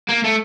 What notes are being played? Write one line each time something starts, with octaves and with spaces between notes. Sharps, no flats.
A#3
A3